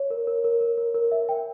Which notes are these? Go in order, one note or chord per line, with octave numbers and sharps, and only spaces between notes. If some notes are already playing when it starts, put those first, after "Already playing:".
Already playing: C#5
A#4
A#4
A#4
A#4
A#4
A#4
E5
G5